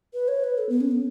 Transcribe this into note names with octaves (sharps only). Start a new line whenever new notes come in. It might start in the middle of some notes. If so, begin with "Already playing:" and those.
B4
C#5
B4
A4
B3
C#4
B3